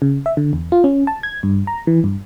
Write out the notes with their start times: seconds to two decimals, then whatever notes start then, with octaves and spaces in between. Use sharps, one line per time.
0.02 C#3
0.26 E5
0.37 D3
0.53 E2
0.72 F4
0.84 C#4
1.07 A5
1.23 G#6
1.43 G2
1.67 A#5
1.87 E3
2.04 G2